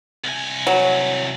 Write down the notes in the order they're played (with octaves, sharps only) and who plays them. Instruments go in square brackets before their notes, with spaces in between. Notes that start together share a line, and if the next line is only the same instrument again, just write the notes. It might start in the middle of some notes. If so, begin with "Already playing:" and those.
[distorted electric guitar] C2 G#5
[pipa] F#3